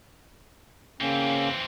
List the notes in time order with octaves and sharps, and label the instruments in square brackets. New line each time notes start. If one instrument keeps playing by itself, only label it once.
[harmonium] C#3 A#3 C#4 [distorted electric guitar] E3 C4